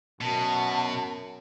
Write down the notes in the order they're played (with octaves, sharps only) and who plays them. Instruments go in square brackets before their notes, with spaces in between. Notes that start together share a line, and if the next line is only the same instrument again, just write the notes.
[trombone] F#2 [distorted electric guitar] B2 [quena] A5